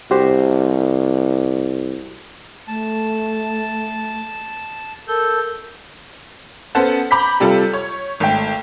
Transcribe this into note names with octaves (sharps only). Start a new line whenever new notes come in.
C2 F#4 G4 C5
A3 A5
A4 A#4 G6
B3 C#4 A4 C5 F#5 A5
A#5 B5 D6 G6 B6
C3 G3 F4 A4
C#5
G#1 A3 G5